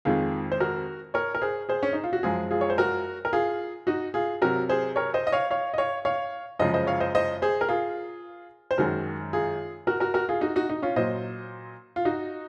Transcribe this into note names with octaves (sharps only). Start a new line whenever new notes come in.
F2 D#3 G#3 F4 G#4
C5
F#4 A#4
A#4 C#5
A#4
G#4 C5
G#4 C5
C#4
D#4
F4
F#4
F#2 F3 G#3 F4 G#4
F4 G#4
C#5
C5
F#4 A#4
A#4
F4 G#4
D#4 F#4
F4 G#4
C3 F#3 F#4 A#4
G#4 C5
A#4 C#5
C5 D#5
D#5
C#5 F5
C#5 F5
D#5
C#5 F5
C#5 F5
F#2 C#3 F3 G#3 C5 D#5
C5 D#5
C#5 F5
C5 D#5
C5 D#5
G#4 C5
A#4
F4 G#4
C5
F#2 D#3 G#3 F#4 A#4
F4 G#4
F#4 A#4
F#4 A#4
F#4 A#4
F4 G#4
D#4 F#4
D#4 F#4
D#4
C#4 F4
A#2 F#3 C5 D#5
F4
D#4 F#4